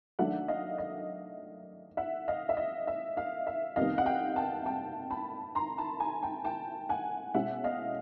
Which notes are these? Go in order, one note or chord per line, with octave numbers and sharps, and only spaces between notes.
D#3 F#3 A3 D4 E5 F#5
D#5 F5
D#5
E5 F#5
D#5 F5
E5
D#5
E5
D#5 F5
E5
F2 C3 D#3 G3 B3 D#5 F5
F#5
F5 G5
G5 A5
G5 A5
A5 B5
A#5 C6
A5 B5
G#5 A#5
G5 A5
G5 A5
F#5 G#5
B2 G#3 C#4 E4 E5 F#5
D#5 F5